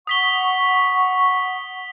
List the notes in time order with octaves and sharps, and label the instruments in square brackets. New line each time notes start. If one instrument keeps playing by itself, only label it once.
[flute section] F#5 C#6 [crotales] D#6 B6 G7